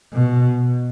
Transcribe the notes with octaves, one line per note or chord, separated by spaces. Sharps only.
B2